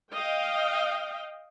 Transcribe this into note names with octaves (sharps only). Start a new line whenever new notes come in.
D#5 F5 G5